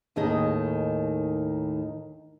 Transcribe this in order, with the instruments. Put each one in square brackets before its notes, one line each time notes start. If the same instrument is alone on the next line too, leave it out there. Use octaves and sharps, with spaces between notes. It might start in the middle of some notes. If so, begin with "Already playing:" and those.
[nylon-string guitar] D#2 A2 D#3 D#4 G#4 D#5